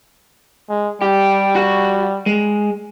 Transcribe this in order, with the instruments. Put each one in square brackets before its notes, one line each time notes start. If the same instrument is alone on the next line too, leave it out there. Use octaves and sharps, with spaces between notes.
[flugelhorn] G#3
[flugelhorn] G3 [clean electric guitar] G4
[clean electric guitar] F#4 F#5
G#3